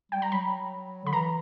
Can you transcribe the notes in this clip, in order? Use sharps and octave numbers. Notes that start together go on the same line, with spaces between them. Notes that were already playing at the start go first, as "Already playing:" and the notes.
G3 G5
A#5
F#3 B5
D3 B5
E3 A#5